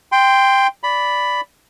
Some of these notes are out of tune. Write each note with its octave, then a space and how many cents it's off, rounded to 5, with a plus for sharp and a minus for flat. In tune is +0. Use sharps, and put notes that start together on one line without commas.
G5 +10 C6 -10
D5 -10 B5 +5